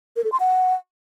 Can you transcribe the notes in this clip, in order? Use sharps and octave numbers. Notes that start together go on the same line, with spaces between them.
A#4
A4
C6
F#5